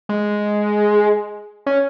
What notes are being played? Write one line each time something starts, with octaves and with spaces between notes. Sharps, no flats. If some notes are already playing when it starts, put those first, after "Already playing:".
G#3
C#4